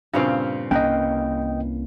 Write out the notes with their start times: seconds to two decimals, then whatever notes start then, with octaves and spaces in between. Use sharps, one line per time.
0.13 G2 A#2 C#3 C4 F5
0.71 C2 A#3 C#4 D#4 A#4 B4 D#5 G5